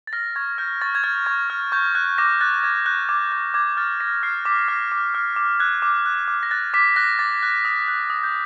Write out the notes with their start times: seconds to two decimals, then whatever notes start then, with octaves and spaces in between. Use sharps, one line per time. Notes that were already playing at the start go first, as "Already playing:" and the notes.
0.07 A6
0.13 F6 A#6
0.36 C#6 G#6
0.58 F6 G6
0.81 C#6 A6
0.95 G#6
1.04 F6 A6
1.26 C#6 G#6
1.50 F6
1.72 C#6 G6
1.95 F#6 G#6
2.18 D6 A#6
2.41 F#6 A6
2.63 D6 G#6
2.86 F#6 G6
3.09 D6 G#6
3.32 F#6 G6
3.54 D6 G#6
3.77 F6 A6
4.00 D6 A#6
4.23 F6 C7
4.45 D6 B6
4.68 F6 A#6
4.92 D6
5.14 F6
5.36 D6
5.59 F#6 G#6
5.82 D6
6.06 F#6
6.28 D6
6.43 A#6
6.51 F#6 A6
6.74 D6 B6
6.96 F#6 A#6
7.19 D6 A6
7.43 F#6
7.65 D#6
7.88 F#6
8.10 D#6
8.23 G6